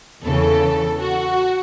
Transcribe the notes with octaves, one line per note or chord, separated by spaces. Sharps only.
E2 C#3 E3 A4
F#4